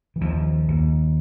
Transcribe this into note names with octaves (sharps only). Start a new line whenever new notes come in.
E3
D#2 F3
D#2